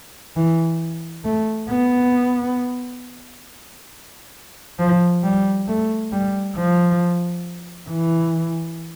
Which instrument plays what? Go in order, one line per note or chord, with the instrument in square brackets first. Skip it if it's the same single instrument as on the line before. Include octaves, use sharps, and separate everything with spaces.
[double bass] E3
A3
B3
F3
G3
A3
G3
F3
E3